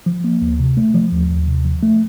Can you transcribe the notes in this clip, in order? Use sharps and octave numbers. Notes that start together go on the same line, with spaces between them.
F3
A#3
D2
C3
A3
F3
D#2
D#2
C3
F3
A3